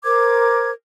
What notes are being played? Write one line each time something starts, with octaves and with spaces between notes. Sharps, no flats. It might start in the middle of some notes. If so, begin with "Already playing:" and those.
A#4 C5 D6 G#6